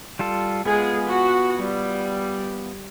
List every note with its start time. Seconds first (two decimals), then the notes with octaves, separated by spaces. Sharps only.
0.19 G3 F4 A4
0.65 G#3 B3 F4 G#4 G#5
1.08 F#4
1.59 G3